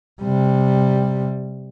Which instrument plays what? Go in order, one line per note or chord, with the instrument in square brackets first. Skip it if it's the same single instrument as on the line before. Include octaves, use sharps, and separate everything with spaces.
[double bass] C3 G3